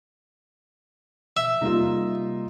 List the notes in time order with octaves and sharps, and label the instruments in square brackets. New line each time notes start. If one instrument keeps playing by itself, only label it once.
[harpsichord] E5
[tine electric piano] C3 G3 A#3 [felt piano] D#4 F4